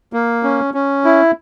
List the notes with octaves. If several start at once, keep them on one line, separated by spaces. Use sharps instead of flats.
A#3
C#4
C#4
E4